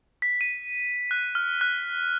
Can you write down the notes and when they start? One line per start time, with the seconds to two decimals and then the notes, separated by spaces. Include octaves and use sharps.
0.22 B6
0.41 D#7
1.11 F#6
1.35 F6
1.61 F#6